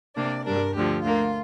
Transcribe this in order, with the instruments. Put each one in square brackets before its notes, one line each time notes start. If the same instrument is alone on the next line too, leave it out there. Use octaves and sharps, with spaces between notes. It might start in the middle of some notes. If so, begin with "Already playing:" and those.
[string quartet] C3 A#3 D4 D5
G2 G3 D4 A#4
D2 D3 F3 G4
D2 D3 A#3 F4